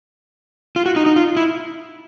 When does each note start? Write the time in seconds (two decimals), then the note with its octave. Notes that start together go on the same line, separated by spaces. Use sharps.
0.76 F4
0.86 F#4
0.96 D#4
1.06 D#4
1.16 F4
1.37 E4